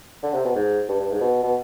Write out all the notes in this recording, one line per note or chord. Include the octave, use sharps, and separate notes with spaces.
D3
C3
B2
G#2
G2
G2
G#2
B2
B2